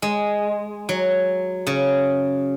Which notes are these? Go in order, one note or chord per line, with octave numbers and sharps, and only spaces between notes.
G#3
F#3
C#3